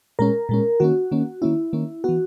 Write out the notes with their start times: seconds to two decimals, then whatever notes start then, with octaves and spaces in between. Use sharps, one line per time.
0.19 A#2 G#3 C#4 A#4
0.49 A#2 G#3 C#4
0.80 D#3 A#3 C#4 F#4
1.12 D#3 A#3 C#4
1.42 D#3 A#3 C#4 E4
1.73 D#3 A#3 C#4
2.04 E3 B3 F#4